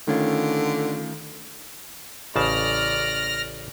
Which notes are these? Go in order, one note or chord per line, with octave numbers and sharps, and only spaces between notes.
D3 D#3 A3 C#4 F4
A1 C#3 D5 A5 F6 A#6